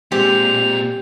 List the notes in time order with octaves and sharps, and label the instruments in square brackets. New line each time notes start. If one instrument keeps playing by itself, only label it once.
[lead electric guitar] A#2 [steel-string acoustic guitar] G3 G#3 C4 [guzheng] G4 [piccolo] F7